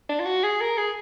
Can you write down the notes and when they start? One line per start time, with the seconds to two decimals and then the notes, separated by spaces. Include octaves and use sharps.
0.09 D4
0.19 F4
0.25 F#4
0.44 G#4
0.61 A#4
0.77 G#4